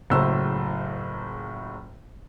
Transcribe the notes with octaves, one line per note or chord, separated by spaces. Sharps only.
F#1 C#2 A2 F#3 C5 E6